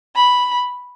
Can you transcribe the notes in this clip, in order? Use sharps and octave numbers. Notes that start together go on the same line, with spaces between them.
B5